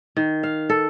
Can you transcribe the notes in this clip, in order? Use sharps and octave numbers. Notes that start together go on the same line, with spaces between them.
D#3
F5
A4